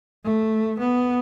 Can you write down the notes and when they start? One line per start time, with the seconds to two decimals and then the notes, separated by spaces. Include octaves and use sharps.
0.25 A3
0.79 B3